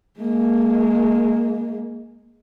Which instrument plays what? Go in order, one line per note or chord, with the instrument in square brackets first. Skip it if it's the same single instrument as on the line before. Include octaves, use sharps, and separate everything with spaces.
[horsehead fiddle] G#3 A#3